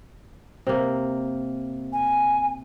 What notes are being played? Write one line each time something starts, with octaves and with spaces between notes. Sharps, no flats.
C3 A#3
G#5